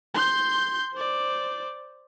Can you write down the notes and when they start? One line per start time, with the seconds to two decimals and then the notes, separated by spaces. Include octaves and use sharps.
0.14 C6 G6
0.94 C5 D5